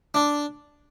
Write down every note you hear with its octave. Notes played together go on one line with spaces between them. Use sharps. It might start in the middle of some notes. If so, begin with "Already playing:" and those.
D4